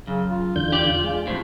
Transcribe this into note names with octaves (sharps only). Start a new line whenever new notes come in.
F#2 C#3
F4
E2 D3 G6
G4 D5
G#3
F2 A2 C5